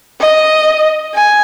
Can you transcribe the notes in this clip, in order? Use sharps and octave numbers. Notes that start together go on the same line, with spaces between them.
D#5
G#5